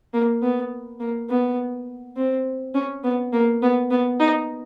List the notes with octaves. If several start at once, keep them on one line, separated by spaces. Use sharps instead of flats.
A#3
B3
A#3
B3
C4
C#4
B3
A#3
B3
B3
D#4